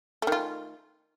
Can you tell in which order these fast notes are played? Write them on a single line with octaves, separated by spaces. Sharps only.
A3 D#3 F4